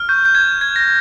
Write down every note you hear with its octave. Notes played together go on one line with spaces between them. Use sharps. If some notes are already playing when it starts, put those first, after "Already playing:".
Already playing: F6
C#6 G6
G6
C#6 G#6
F#6 G#6
A#6